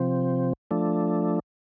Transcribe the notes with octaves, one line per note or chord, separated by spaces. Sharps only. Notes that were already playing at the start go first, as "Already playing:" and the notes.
Already playing: C3 F3 C4
F3 A3 D4